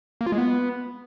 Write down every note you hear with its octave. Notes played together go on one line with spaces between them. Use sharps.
A#3
F4
G#3
B3